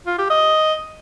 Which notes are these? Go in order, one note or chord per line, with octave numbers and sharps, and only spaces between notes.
F4
G4
D#5